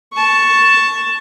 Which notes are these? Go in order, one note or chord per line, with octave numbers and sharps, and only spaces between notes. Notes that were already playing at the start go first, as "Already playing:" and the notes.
A5 C#6